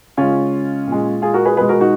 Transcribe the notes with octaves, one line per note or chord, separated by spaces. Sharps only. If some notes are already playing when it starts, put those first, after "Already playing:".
C#3 G#3 C#4 F4
A#2 G#3
F4 G#4
F#4 A#4
G#4 B4
B2 G#3 G#4 B4
F#4 A#4
D#4 F#4